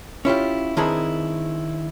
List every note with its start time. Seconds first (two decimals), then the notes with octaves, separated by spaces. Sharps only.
0.25 C#4 E4 F4 G4
0.77 D#3 C4 D4 E4 G#4 B4